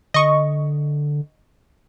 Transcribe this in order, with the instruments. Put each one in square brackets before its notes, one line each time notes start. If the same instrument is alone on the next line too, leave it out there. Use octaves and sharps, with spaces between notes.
[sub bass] D3 [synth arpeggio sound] D#5 C#6